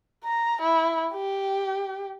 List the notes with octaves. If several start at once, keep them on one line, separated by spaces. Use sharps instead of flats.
A#5
E4
G4